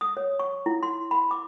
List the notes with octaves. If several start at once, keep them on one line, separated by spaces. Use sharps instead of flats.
D#6
C#5
C#6
E4
C6
B5
D6